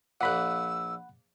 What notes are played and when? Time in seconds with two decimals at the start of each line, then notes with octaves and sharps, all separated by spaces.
0.21 A#1 A#2 F#5 B5 E6 F#6